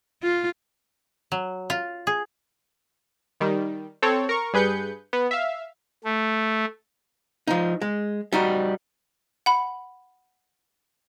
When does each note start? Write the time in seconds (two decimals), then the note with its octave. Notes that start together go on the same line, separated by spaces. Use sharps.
0.23 F4
1.32 F#3
1.70 F4
2.07 G#4
3.41 D#3 G3
4.02 C4 A4 C#5
4.29 A#4 C#6
4.53 G2 G#4 B4 G6 C#7
5.13 B3
5.31 E5 F5
6.04 A3
7.47 F3 D#4
7.81 G#3
8.33 G3 D#4 F#4
9.46 F#5 B5